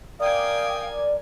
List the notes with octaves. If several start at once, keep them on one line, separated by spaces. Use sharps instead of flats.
A#4 D5 F5 G5 G#5 D#6